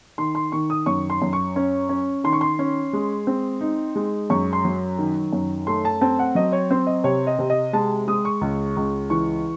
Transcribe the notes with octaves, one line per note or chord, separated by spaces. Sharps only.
D#3 C6
C6
D#3 C#6
D#6
F#2 C#6
C6
F#2
C#6
C#4
C#4
D#3 C6
C#6
C6
C#4
G#3
C4
D#4
G#3
F#2 C#6
C6
F#3
D#3
F#2
A3 C6
A5
C4 A5
F#5
F#3 D#5
C#5
C4 C5
D#5
C3 C#5
D#5
C3
D#5
G#3 A5
G#3 D#6
C#6
C#2
C#2
E3 C#6